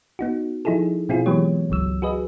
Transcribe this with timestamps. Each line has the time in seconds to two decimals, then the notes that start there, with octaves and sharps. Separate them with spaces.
0.19 B3 D#4 F#4
0.65 F3 D#4 E4 G#4 A4
1.09 B2 C4 E4 F4 G#4
1.26 E3 F#3 G#3 B3 G4 C#5
1.70 G1 C#2 F#3 E6
2.02 F#4 G#4 B4 D#5